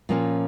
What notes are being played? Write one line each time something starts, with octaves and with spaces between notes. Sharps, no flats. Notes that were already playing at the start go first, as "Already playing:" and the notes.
A#2 F3 A#3 C#4